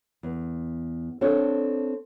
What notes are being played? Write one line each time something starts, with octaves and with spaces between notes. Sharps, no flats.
E2
C4 D4 A4 C#5